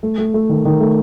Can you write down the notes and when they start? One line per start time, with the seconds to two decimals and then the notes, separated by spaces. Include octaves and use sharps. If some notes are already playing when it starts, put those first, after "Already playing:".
0.03 A3
0.18 A3
0.34 A3
0.49 D#3
0.65 D#3
0.81 A3